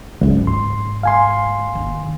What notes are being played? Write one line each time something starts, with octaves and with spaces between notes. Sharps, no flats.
G#1 C#2 C#3 F#3
G#2 C6
F5 G#5 C6
D#3 A#3